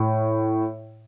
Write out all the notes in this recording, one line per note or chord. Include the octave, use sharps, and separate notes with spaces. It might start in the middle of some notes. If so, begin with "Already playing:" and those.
Already playing: A2